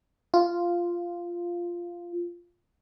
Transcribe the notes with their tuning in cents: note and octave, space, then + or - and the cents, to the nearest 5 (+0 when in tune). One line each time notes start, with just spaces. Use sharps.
F4 -10